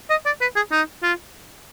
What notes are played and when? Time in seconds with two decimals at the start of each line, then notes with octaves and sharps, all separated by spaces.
0.10 D#5
0.26 D5
0.41 B4
0.56 G#4
0.72 D#4
1.03 F4